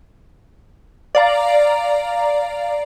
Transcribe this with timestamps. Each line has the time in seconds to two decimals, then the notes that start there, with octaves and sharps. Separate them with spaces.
1.15 D5 F5 A#5